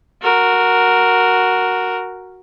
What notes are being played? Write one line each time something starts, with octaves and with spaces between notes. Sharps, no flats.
F#4 A#4